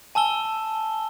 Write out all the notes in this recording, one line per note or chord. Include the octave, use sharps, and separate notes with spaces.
G#5 A5 E6 G7